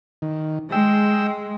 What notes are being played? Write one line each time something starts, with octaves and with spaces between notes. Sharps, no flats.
D#3
G#3 G5 E6